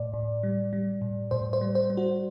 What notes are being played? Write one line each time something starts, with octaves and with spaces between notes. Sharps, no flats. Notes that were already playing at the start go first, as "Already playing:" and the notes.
Already playing: A2 D5
A2
G3
G3
A2
A2 C5
C5
G3
C5
G3
F#4